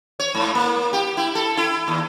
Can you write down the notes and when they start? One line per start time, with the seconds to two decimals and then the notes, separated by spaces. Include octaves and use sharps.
0.19 C#5
0.35 G#2
0.55 A#3
0.93 G4
1.17 E4
1.35 A4
1.57 E4
1.88 D#2